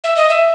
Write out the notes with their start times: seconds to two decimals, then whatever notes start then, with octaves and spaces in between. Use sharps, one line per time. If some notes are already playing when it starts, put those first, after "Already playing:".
0.04 E5
0.16 D#5
0.30 E5